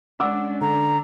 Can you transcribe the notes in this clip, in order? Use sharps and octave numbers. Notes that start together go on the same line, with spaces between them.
G#3 C#4 D4 F#5 D6 E6
D3 D4 A#5